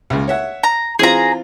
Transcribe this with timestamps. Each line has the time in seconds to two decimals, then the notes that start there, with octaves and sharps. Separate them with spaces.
0.10 C#2 C#3
0.28 C#5 E5 F#5
0.63 A#5
0.99 E3 C4 F4 G#4 A#5